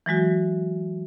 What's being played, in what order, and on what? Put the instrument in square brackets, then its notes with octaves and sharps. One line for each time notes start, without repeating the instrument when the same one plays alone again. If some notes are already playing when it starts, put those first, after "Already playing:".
[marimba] E3 F#3 G#3 F#4